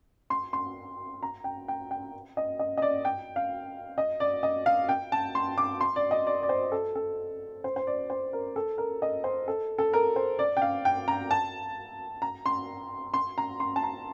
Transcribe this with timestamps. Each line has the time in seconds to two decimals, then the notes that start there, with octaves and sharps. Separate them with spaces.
0.30 C6
0.53 C6
1.23 A#5
1.44 G5
1.68 G5
1.91 G5
2.37 D#5
2.59 D#5
2.77 D#5
2.82 D5
3.05 G5
3.36 F5
3.98 D#5
4.20 D5
4.43 D#5
4.66 F5
4.89 G5
5.12 A5
5.35 C6
5.58 D6
5.81 C6
5.96 D5
6.11 D#5
6.27 D5
6.43 D5
6.49 C5
6.72 A4
6.95 A4
7.64 C5
7.76 C5
7.87 D5
8.10 C5
8.33 A#4
8.56 A4
8.78 A#4
9.02 D#5
9.24 C5
9.48 A4
9.78 A4
9.93 A#4
10.16 C5
10.39 D5
10.57 G5
10.62 F5
10.85 G5
11.08 A#5
11.31 A5
12.22 A#5
12.46 C6
13.14 C6
13.38 A#5
13.60 C6
13.76 A5
13.83 A#5